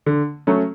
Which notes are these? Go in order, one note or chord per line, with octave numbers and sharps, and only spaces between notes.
D3
F#3 A3 C#4